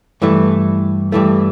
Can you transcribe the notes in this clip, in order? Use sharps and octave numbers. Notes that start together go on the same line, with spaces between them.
G2 E3 A3
G2 E3 A3